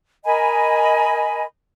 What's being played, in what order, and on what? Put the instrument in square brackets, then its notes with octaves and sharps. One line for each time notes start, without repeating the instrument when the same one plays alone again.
[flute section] A#4 D#5 G#5 B5